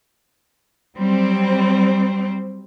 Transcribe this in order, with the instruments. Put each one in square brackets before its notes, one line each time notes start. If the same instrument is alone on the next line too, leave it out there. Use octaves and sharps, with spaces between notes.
[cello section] F#3 G3 C4